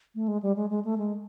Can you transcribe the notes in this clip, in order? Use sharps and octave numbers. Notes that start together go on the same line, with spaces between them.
A3
G#3
G3
G#3
G#3
A3
G#3